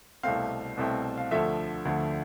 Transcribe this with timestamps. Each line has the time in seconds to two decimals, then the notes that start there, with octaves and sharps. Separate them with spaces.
0.23 C2 B2 A3 C4 F5
0.77 C2 B2 A3 C4
1.18 F5
1.31 D2 D3 F3 A3 E5
1.85 D2 D3 F3 A3